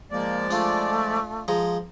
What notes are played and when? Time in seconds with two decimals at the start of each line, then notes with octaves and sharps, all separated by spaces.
0.11 F3 G#3 A#3 D5
0.51 A3 D4 F4
1.48 F3 G#3 A#5